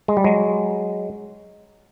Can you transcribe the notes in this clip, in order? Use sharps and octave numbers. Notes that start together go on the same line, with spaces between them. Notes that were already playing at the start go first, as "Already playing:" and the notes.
G#3
G3
F#3 G#3